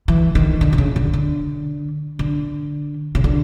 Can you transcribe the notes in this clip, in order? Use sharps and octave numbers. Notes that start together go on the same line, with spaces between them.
E3
D#3
D3
C3
C#3
D3
D3
D3
C#3
D3